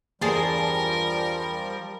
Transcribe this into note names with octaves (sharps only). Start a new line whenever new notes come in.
E2 G2 F3 G3 G#4 A#4 A5 C6